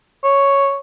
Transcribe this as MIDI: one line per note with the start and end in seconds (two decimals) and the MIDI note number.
0.24 0.79 73